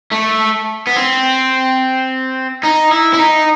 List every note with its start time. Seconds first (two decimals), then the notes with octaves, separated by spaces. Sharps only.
0.11 A3
0.87 B3
0.96 C4
2.63 D#4
2.91 E4
3.13 E4
3.19 D#4